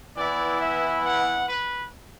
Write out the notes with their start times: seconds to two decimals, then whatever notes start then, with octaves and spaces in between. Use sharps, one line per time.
0.17 E3 B3 E4 D5
0.60 E5
1.04 F#5
1.47 B4